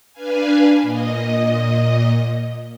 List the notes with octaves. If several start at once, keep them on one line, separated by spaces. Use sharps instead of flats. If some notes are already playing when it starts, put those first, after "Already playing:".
D4 B4 F5 G#5
A#2 D#5